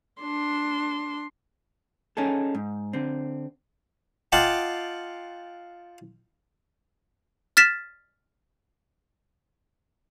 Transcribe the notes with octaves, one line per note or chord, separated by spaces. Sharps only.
D4 C6
C#4 D#4 G#4 A4
G#2
D3 C4
F4 D#5 F#5 G5 A5 D6
F6 A6 B6 E7